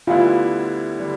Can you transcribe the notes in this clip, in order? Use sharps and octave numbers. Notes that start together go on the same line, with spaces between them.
D2 D3 G3 B3 E4 F4
D3 G3